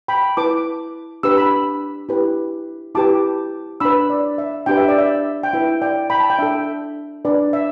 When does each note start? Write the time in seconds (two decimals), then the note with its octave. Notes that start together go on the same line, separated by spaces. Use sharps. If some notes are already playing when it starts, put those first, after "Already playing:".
0.08 G5 B5
0.37 E4 B4 A5 D6
1.23 D4 G4 B4 E6
1.37 B5 E6
2.09 E4 G4 B4
2.95 E4 G4 B4 A5 D6
3.80 D4 B4 B5 E6
4.10 D5
4.38 E5
4.66 D4 G4 B4 G5
4.77 E5
4.88 D5
4.98 E5
5.43 G5
5.53 E4 B4 E5
5.82 D5 G5
6.10 G5 B5
6.20 A5
6.30 G5
6.39 D4 A4 E5
7.25 D4 B4 D5
7.53 E5